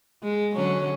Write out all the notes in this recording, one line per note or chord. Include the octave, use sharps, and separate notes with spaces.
G#3
D3 F#3 C#4